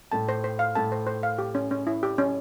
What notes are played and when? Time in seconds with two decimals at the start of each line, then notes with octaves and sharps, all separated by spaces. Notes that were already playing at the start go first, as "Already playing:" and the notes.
0.12 A2 A5
0.29 C5
0.44 C5
0.59 F5
0.75 A2 A5
0.92 C5
1.07 C5
1.23 F5
1.38 G4
1.55 C#4
1.71 C#4
1.87 E4
2.03 G4
2.18 C#4